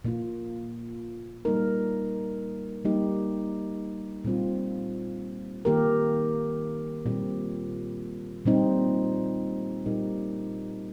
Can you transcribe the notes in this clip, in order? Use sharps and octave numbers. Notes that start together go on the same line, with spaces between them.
A#2 A#3 F4
G3 A#3 D#4 A#4
G3 A#3 D#4 G4
A#2 G3 C4 F4
D#3 A#3 G4 A#4
A#2 G3 C4 G4
A#2 G3 C4 D#4
A#2 G3 D#4 G4 A#4